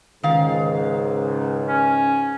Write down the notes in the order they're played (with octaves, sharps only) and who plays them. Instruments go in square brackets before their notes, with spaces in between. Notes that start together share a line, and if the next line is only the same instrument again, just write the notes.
[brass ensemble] C#2 G#2 [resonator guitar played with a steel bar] D#3 F5
[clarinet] C#4